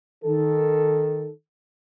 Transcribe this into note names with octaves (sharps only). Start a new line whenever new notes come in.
D#3 A4